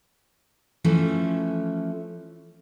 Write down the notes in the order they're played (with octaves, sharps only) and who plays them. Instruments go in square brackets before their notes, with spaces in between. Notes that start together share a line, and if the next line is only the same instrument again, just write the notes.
[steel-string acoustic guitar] E3 F3 A3 C#4